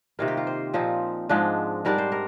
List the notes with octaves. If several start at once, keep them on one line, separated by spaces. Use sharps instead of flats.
C3 D#3 A#3 F4
G4
F4
C5
A#2 F3 C4 D#4
G#2 F3 G#3 D4
G#2 G3 D4 A#4
C5
A#4